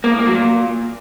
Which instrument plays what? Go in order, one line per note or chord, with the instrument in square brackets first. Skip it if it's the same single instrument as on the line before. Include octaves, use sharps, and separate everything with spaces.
[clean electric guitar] A#3
A2
A#3
F#3
A#2